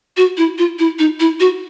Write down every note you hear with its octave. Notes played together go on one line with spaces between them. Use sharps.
F#4
E4
F4
E4
D#4
E4
F#4